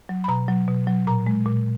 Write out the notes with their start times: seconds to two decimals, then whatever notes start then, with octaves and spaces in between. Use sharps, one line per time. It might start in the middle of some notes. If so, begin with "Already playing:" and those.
0.09 F#3
0.24 B5
0.28 B2 A#5
0.48 F#3
0.68 B2
0.87 F#3
1.07 A#2 A#5
1.26 G#3
1.46 A#2